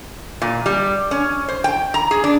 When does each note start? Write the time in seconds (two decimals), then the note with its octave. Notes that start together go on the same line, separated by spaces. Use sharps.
0.42 A#2
0.66 G3
1.11 C#4
1.48 C5
1.64 G5
1.94 A#5
2.11 G#4
2.24 D4